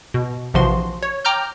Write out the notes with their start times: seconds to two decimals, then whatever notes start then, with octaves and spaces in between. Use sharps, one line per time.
0.14 B2
0.54 A#1 C3 E3 F3 F#4 C6
1.03 C#5
1.25 G5 A#5 D6 F6 G6